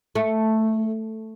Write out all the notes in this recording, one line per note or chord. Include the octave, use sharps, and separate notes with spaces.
A3